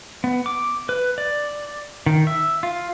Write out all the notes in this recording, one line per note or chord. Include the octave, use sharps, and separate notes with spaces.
B3
D6
B4
D5
D#3
E5
F4